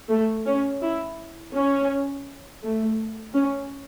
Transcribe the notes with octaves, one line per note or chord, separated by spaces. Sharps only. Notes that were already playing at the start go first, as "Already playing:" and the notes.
A3
C#4
E4
C#4
A3
C#4